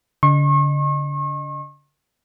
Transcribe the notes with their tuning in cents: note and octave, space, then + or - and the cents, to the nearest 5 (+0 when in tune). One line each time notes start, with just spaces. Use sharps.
D3 -40 D#5 -25 C#6 -40